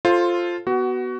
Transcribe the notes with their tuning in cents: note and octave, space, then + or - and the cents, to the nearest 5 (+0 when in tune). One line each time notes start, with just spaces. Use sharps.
F4 +0 A4 +0 C5 +15
B3 +0 F#4 +20